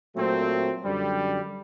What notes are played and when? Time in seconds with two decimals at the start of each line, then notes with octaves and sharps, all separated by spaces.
0.15 A#2 F#3 A3 C4
0.84 F#2 D3 G3